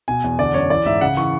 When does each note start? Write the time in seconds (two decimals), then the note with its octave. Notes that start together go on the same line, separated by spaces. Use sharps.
0.08 B2 G#5
0.24 E2
0.39 D3 D5
0.54 F#2 C#5
0.70 E3 D5
0.86 G#2 E5
1.01 C#3 F#5
1.17 E3 C#6